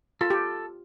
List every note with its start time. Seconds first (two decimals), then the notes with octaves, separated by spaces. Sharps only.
0.21 F4 A4
0.30 G4